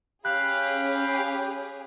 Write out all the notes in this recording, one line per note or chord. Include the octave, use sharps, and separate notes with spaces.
C#4 G4 G#4 F5 B5 F#6